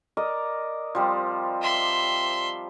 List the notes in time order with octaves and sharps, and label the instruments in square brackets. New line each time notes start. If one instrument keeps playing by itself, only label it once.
[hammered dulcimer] A#4 D5 D#5
F3 G3 C4
[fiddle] E5 C6